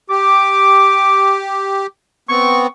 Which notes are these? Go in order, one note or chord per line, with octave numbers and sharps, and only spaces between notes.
G4 D6
B3 C4 C#6